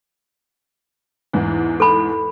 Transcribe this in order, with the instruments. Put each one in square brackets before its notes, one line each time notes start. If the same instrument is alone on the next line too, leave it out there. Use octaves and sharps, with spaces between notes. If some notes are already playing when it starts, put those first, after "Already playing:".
[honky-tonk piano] E2 G#2 E3
[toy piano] A4 B5